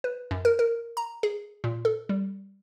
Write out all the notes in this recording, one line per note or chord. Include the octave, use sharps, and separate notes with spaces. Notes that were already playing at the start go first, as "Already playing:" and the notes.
B4
F#2
A#4
A#4
A#5
G#4
A#2
A4
G3